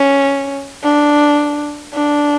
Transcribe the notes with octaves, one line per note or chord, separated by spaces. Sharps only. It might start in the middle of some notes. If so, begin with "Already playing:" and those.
Already playing: C#4
D4
D4